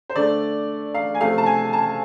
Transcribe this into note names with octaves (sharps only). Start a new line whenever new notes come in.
C5
D3 A3 D5
F5
G#5
C3 F3 A3 F5
A5
G#5
A5